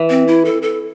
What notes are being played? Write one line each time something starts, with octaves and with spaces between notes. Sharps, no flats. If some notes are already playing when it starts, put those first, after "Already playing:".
Already playing: E3
C4
E4
A4
A4